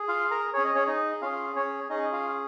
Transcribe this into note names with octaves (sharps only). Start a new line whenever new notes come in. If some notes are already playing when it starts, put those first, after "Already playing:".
Already playing: G#4
F4 F5
A#4 A#5
C#4 G#4 C#5
D#5
C#4 C#5
D#4 D#5
C#4 F4 G#4 F5
C#4 C#5
C#4 D#4 G#4 D#5
F4 F5